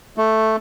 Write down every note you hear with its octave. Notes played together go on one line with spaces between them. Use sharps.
A3